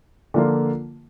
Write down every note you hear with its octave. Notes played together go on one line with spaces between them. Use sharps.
D3 F3 A#3 F4